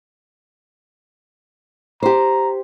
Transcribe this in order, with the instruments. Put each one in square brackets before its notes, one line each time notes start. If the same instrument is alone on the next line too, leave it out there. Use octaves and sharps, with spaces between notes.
[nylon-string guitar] G4 C5 [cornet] A#5